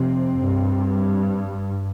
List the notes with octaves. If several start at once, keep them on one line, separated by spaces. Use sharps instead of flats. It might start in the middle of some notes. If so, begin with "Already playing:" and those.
Already playing: F2 C3 C4
G2